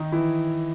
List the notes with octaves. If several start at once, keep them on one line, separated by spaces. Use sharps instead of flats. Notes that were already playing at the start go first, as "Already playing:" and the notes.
Already playing: D#3 D#4
E3 E4